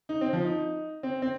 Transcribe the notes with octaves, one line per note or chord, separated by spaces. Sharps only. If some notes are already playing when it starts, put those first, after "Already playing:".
D#4
C4
F3
D#4
C4
C4